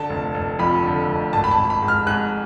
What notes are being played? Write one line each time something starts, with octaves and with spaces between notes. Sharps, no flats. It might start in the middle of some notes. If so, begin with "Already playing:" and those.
Already playing: D3 A5
F1
F1
F2 B5
D3
F1
G#1 A5
B5
A5
G#1
B5
G#2
F6
G#2 F#6